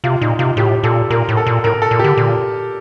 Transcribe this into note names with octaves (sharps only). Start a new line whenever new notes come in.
C3 F4
A#2 D#4
C3 F4
A2 G4
A#2 A4
A#2 A#4
A2
A4
A#2
A2 A#4
A4
A#2
D3 G4
A#2